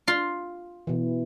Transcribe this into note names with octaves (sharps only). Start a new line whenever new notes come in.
F4 C6
B2 E3